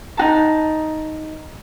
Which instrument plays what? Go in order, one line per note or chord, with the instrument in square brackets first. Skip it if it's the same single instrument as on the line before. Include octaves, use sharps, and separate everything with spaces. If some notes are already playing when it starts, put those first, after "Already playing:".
[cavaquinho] D#4 F#4 A5